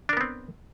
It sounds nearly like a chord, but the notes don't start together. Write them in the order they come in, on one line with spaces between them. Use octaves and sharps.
D4 A#4 B3 C4